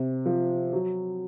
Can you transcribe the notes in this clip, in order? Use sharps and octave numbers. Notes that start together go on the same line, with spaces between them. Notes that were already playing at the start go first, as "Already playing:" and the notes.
Already playing: C3
F3
F#3